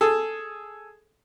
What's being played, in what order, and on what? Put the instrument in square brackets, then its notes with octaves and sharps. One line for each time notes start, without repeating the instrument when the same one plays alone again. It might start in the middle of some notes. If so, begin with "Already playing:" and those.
[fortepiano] G#4 A4